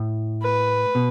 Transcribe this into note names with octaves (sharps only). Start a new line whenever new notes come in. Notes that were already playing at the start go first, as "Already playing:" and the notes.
Already playing: A2
B4
B2